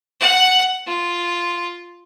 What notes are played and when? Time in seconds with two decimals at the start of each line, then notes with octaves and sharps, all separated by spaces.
0.20 F#5
0.87 F4